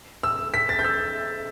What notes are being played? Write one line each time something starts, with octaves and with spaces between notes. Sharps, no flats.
E6
B6
A6
G6
E6